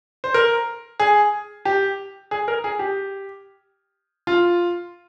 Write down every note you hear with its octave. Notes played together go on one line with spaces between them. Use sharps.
C5
A#4
G#4
G4
G#4
A#4
G#4
G4
F4